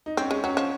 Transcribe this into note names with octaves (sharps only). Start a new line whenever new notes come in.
D#4
C4 C#4
G#3
F#3 C#4
F3